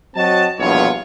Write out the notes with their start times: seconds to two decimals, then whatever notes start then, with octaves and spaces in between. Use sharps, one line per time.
0.15 F#3 C4 F#4 D#5 A5
0.59 A#1 E2 G2 B2 F4 C#5